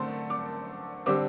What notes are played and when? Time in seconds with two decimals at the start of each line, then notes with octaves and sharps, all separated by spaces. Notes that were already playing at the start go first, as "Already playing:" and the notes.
Already playing: D3 A3 C4 A5 C6
0.30 D6
1.06 D3 G3 C4 D6